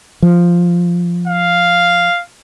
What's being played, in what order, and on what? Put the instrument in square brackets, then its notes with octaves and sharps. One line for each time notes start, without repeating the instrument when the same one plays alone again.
[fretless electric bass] F3
[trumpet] F5